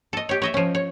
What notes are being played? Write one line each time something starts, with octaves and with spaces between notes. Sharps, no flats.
A4 D#5
G4 C#5
C#5 D#5 E5
F3 C#4
C#5